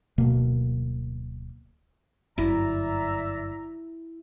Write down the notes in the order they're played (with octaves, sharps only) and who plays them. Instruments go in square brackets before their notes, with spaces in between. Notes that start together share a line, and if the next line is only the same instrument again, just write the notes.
[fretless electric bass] D1 B2 A#3
[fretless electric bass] G1 F#2 [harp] E4 [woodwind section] D5 E5 A#5